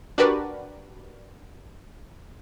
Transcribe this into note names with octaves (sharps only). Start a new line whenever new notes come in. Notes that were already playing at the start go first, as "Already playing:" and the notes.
D4 F#4 G4 A#4 B4 D5